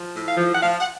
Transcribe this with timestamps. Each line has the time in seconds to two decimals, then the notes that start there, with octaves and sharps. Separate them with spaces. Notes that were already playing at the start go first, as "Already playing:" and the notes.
Already playing: F3
0.15 A2
0.25 F5
0.37 F3
0.53 F#5
0.61 F3 F5
0.79 F#5